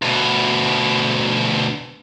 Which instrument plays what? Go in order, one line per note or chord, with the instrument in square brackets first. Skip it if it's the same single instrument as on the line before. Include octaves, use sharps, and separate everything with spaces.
[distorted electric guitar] D2 B2